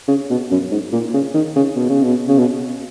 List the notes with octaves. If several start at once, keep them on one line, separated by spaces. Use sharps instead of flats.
C#3
B2
F#2
G#2
A#2
C#3
D#3
C#3
B2
C#3
B2
C#3
B2